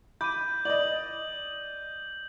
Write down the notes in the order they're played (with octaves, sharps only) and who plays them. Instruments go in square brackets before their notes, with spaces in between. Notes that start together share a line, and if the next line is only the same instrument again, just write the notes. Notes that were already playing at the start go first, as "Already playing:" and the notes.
[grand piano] B5 D6 [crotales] G6 D#7
[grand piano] D5 D#5 [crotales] F#7